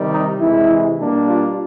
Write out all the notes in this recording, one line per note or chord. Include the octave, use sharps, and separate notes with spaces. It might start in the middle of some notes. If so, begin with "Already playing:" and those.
Already playing: C3 D#3 G3
D#4
C3 E3 G#3 E4
B2 G3 A#3 D4
F4